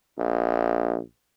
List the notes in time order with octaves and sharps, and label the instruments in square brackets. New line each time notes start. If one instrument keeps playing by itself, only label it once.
[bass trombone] A#1